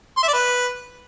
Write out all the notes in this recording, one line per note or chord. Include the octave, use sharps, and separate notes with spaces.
C6
E5
D5
B4